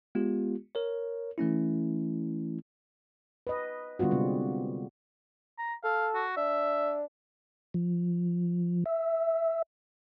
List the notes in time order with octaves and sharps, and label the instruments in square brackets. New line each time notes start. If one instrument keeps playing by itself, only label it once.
[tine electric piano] G#3 B3 F4 G4
A#4 C#5
E3 A3 C#4 E4
[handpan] B4 D#5
D3 G3 B3 F4 F#4
C3 G#3 C4 F4
[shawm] A#5
[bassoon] A4 [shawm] F5
[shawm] F#4
[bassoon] D4 [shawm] E5
[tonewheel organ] F3
E5